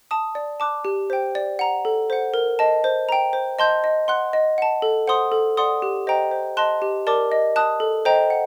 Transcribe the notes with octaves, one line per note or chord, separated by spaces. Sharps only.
A5 D#6
D5
A5 D6 F#6
G4
C5 G5
D5
F#5 A#5
A4
C5 F#5
A#4
D#5 A5
C5
G5 A#5
C5
D#5 A5 C6 G6
D#5
F#5 C6 F#6
D#5
F#5 A5
A4
C5 F#5 C6 D#6
A4
D5 F#5 C6 D#6
G4
C5 D#5 G5 A#5
C5
D#5 A5 C6 F#6
G4
A#4 D5 A5 D6
D#5
A5 D#6 F#6
A4
C5 D#5 G5 A#5
F#5